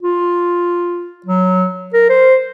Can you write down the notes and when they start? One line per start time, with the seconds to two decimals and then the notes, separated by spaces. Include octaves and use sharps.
0.03 F4
1.26 F#3
1.93 A#4
2.09 C5